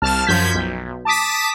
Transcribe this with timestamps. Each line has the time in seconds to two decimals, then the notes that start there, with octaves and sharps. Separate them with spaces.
0.02 C2 A5 F6
0.27 F#2 F3 G6 G#6 B6
0.54 B1
1.05 A5 D6 D#6 B6